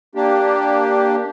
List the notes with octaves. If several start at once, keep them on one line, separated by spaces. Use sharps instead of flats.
A#3 D4 G4